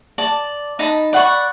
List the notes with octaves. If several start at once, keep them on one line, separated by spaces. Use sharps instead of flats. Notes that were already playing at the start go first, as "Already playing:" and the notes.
D5 A5
D#4 A5 B5
D5 F#5 B5 C#6